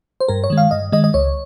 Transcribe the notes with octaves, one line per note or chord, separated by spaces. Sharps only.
C5
G2 A#4
C#5
D#3 G#3
F5
G2 D#5
D#3 G#3 D#5
D#5
C#2 C#5